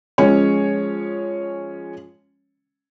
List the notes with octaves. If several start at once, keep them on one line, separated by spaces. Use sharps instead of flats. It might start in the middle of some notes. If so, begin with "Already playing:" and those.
F3 G#3 C#4 C#5